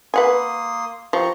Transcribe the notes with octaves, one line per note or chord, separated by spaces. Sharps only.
A#3 B4 F#5 G#5 C6 D#6
F3 G4 A#5 C#6